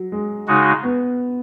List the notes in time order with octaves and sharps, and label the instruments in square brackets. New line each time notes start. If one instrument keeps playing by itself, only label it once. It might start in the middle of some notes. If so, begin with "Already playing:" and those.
Already playing: [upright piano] F#3
G#3
[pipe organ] C#3 G#3 D#4 F#4
[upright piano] B3